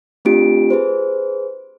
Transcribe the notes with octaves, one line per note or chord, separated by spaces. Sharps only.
A3 C4 D4 F4 G4 D7
G#4 B4 C5